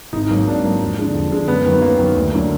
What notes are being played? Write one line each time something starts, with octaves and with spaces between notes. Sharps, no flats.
G#1 D#4
G#2 F#3 A#3
G#1 D4
G#2 F#3 A#3
F2
D3 G#3
F2
D3 G#3
F#2 B3
D#3 F#3 A#3
B3
F#2 A#3
D#3 F#3 A#3
D2
D3 F#3 A#3